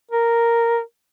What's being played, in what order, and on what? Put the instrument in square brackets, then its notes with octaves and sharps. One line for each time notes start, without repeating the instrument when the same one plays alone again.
[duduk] A#4